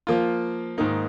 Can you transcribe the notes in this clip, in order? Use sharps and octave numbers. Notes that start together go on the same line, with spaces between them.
F3 A#3 F4
G#2 D#3 A#3 D#4